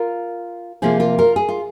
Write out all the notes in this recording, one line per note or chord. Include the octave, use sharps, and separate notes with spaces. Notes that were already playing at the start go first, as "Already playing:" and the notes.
Already playing: F4 A#4
C3 F3 A#3 F4 G#4 C5
F4 A#4
F4 A#4
G#4
F4